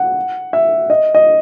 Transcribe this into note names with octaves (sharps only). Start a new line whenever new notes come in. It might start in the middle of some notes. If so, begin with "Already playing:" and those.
Already playing: F#5
E5
D#5
D#5